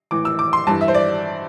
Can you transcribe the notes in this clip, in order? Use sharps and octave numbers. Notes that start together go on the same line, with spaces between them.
A2 E3 D6
E6
D6
C6
G2 E3 A5
E5
C5
D5